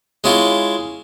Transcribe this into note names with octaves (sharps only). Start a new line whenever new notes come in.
G#3 C#4 E4 F4